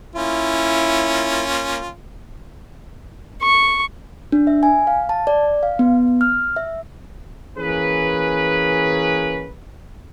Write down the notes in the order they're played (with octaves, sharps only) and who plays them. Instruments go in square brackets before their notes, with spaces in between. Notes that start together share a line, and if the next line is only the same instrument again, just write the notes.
[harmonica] A#3 C#4 F4 [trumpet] E4
[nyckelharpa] C#6
[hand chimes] D4
E5
G#5
F5
A5
D5
F5
B3
F6
E5
[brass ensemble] E3 A#3 C#4 G#4 B4